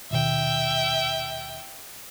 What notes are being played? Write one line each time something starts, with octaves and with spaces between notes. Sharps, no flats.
D#1 B2 D#3 E5 G5